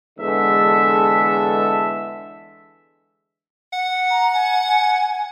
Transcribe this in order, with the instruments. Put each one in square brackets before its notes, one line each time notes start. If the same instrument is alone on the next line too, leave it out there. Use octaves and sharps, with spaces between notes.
[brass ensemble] E2 D3 G#3 A4 E5
[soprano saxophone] F#5
[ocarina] A#5
G#5